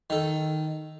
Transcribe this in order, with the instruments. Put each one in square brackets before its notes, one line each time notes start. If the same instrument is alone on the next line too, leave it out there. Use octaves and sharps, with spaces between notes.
[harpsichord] D#3 A4